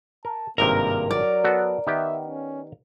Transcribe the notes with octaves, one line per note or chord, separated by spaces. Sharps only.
A#4 A5
G#1 G2 C3 A#3 A#4 A#5
F#3 D5
B3 F#4 A4
D#3 B3 G4 E5
C#4